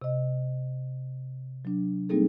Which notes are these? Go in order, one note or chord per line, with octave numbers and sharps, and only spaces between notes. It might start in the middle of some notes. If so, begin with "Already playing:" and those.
C3 D#5
F#3 D4
G3 A#3 C4 D#4 G#4 A4